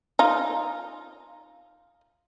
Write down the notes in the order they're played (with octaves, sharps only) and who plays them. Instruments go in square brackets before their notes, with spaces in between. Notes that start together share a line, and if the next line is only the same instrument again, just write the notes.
[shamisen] D#4 F4